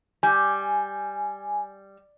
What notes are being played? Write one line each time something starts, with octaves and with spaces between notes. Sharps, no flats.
G3 G#5